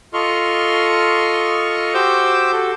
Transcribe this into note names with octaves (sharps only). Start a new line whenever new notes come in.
F4 A4 D#5 C6 C#6 F6
F#4 G4 C5 D6 E6 G6
F#4 A4